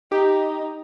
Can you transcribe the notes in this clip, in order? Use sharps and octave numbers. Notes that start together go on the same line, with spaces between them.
D#4 G4